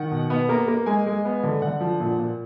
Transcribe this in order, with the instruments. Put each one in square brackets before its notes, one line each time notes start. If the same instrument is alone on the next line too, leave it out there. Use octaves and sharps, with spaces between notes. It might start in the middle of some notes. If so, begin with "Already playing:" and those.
Already playing: [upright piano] D#3 F#5
B2
B3
A#3 A#5
A#3
G#3 G#5
G#3
B3
D3
D3 F#5
F3
A#2
A#2